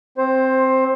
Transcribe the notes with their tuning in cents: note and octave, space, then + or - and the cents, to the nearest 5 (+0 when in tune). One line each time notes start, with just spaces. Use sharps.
C4 +0 C5 +15